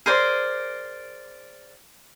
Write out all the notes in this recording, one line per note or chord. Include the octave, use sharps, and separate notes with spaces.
G#4 A#4 C5 D5